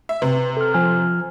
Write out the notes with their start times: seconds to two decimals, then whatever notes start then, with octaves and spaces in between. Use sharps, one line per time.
0.09 E5
0.22 C3 B4
0.57 A4 F6
0.74 F3 G#5 F6